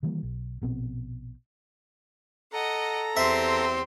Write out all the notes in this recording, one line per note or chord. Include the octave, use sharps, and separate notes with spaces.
D#3 E3 G3 A#3
B1
A#1 B2 C4
A4 D#5 F#5 A#5
E2 C4 G4 E5 C6